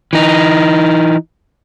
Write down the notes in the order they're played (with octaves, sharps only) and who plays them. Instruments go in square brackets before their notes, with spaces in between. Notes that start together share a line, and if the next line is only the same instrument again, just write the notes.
[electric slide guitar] E3 D#4